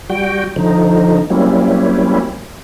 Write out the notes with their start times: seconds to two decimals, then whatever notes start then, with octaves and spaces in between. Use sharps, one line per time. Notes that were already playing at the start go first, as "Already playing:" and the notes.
0.10 G3 F#4 G5
0.56 D3 F3 D#4
1.30 F#3 G3 A#3 C4 C#4 E4